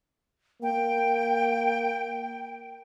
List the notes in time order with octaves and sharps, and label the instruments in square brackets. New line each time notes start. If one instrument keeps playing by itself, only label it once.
[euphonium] A#3 [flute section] G5